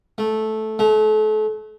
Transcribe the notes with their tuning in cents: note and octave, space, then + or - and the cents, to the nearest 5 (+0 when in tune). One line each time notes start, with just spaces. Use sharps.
A3 -10
A3 -35